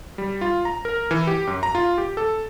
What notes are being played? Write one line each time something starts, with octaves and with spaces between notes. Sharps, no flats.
G3
F4
A#5
A#4
E3
G4
F#2
A#5
F4
G4
A4